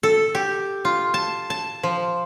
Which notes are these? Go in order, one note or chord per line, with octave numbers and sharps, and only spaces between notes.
A4
G4
F4
A5
A5
F3